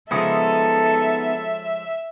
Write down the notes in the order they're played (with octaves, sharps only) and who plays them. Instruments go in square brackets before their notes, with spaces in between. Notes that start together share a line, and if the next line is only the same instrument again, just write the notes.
[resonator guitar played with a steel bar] C#3 F3 G#3 [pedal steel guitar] B3 D#4 D#6 [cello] A4 [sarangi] E5